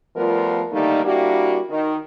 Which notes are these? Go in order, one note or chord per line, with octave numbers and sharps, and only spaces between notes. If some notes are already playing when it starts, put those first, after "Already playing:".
F3 G3 A3 B3 F4 A#4
D3 D#3 G3 A3 A#3 D#4
G3 A#3 D4 E4 F#4 G4
D#3